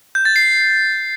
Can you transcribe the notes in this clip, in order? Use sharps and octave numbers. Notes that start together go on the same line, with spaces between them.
G6
A6
C7